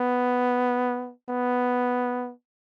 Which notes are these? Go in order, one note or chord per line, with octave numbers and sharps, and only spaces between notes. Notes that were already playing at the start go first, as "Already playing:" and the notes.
Already playing: B3
B3